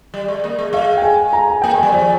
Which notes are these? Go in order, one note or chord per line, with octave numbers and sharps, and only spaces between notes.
G3
G#3
A#3
G#3
G#3 F5
G5
G#5
A#5
G#5
A#3 G5
G#3
G#5
G3
F3 G#5